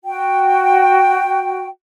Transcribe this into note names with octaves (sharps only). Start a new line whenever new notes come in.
F#4 G5